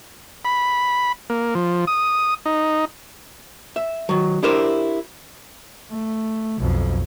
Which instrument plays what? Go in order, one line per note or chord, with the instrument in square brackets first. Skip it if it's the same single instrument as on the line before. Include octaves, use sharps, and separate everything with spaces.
[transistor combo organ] B5
A#3
F3
D#6
D#4
[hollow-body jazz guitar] E5
D#3 F#3
D4 E4 G4 A#4 C5
[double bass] A3
B1 F2